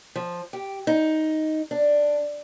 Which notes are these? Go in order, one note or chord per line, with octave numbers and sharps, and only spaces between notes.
F3
G4
D#4
D4